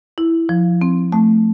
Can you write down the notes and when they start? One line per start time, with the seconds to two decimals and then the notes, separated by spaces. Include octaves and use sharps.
0.18 E4
0.49 F3
0.81 C4
1.12 A3